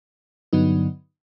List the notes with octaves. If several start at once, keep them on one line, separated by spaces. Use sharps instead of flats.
G2 D3 F#3 B3 D#4